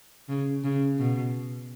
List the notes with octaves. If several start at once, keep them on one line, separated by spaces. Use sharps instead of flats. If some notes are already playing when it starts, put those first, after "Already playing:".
C#3
C#3
B2